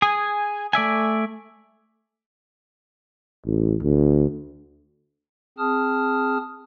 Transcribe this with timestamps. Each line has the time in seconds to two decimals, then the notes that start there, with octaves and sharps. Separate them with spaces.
0.02 G#4 G#5
0.73 A3 D5 E5 G#5
3.46 A1
3.82 D2
5.58 C4 G#4 A5 D#6 F6